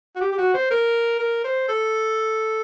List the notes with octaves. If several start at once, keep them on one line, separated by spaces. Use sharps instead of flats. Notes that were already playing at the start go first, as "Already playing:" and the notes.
F#4
G4
G4
F#4
C5
A#4
A#4
C5
A4